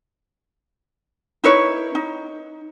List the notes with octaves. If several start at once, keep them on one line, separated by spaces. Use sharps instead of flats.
D#4 E4 B4 C#5
D#4